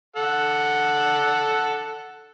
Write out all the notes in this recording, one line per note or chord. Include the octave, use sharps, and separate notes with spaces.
A4 F#5